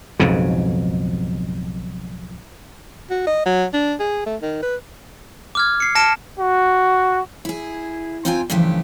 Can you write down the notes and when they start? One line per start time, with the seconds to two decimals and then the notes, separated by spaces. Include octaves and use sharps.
0.20 B1 F2 G#2 C#3
3.10 F#4
3.27 D#5
3.46 F#3
3.73 D4
4.00 G#4
4.26 A3
4.42 D#3
4.62 B4
5.55 D6 F6 G#6
5.80 C7 C#7
5.95 A5 F6 A#6 C#7 D7 E7
6.39 F#4
7.45 E4 G#4
8.25 C4 D#4 F4 F5 G5 G#5
8.50 G2 C#3 E3 F3 A3 G4